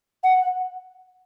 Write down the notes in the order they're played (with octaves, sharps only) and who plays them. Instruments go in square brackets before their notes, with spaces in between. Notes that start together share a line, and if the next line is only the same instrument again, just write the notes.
[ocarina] F#5